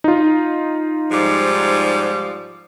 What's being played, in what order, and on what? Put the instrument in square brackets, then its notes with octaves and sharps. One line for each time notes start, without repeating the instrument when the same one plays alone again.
[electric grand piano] D#4 F4
[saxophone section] G#2 F3 G3